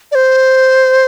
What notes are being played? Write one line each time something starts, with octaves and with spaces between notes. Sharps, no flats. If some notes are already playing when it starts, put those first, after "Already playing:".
D5
C5